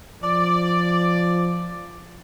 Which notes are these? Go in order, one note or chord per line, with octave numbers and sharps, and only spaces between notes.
F3 D5